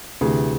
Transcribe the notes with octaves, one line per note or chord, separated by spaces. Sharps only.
D2 C3 E3 G#4